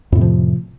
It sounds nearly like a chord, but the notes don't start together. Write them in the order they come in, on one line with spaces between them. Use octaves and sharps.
F2 A2 C3 F3